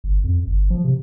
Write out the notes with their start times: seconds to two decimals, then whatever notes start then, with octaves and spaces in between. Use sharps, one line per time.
0.04 G1
0.24 F2
0.47 G1
0.70 F3
0.84 C3